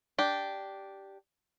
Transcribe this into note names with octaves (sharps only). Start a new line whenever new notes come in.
D4 G4